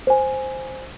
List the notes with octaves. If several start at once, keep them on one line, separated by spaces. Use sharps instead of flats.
C5 G#5